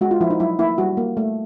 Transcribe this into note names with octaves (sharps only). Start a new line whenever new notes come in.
G#3 F#4
F4
F3 E4
D#4
F#3 E4
A#3 E4
G3 F#4
A#3
A3